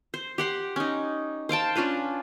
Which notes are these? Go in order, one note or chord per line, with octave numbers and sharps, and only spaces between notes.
C5
G4 F#5 C6
C#4 D#4
C5 F5 G5 A5
C#4 D4 F4 B4